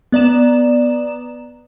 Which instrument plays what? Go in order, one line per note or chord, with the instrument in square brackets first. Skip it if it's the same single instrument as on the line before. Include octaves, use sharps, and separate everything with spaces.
[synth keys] B3 D5 A#5 E7